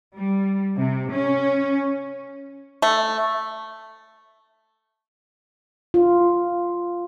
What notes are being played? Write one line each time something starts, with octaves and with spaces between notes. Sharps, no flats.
G3
C3
C#4
A3
F4